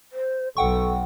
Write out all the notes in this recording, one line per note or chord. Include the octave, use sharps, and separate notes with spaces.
C5
B1 A4 F#5 G5 C#6